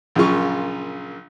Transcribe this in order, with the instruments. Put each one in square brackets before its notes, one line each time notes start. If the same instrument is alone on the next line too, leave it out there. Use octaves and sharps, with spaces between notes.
[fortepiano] A#1 F#2 C#3 F4 C#6